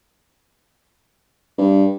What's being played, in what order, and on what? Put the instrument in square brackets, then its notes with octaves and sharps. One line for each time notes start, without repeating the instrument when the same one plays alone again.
[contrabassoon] G2